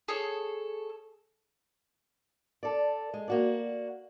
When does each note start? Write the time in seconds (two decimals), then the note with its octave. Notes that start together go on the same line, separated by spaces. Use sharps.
0.08 G#4 A4 C#5
2.63 A4 D5
3.14 G#3
3.28 A#3 F#4 D5